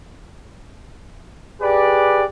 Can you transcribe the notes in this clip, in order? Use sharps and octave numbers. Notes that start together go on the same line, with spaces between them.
G4 G#4 B4 D5